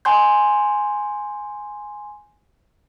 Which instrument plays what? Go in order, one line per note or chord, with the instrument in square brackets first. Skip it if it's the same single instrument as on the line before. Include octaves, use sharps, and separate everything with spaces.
[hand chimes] G#5 C6 G6